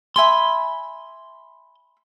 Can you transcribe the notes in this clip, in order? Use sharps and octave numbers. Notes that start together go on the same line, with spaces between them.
E5 G#5 B5 C6